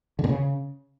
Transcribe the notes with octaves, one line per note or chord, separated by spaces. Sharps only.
D3
A#2
C#3